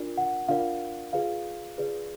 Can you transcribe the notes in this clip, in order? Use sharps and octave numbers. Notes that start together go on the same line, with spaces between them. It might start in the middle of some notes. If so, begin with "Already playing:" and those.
Already playing: D4 F4 A#4 D5
F#5
D4 F4 A#4 D5 F5
F4 G#4 B4 D5 F5
F4 G#4 B4 D5